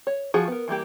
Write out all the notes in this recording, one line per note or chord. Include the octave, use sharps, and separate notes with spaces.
C#5
F3 F#4 G#4
B3 A#4
E3 G3 A#3 G4